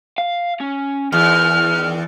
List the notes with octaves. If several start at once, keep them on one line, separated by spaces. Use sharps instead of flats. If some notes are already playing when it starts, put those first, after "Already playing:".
F5
C#4
E2 D#3 F6